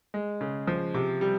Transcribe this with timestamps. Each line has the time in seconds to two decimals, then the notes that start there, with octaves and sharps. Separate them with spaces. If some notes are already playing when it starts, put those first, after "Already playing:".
0.14 G#3
0.41 C#3
0.67 F3
0.94 C3
1.21 G3